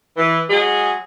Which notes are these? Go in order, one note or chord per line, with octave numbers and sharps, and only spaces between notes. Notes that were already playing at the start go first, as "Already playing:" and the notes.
E3
F#3 G#3 G#4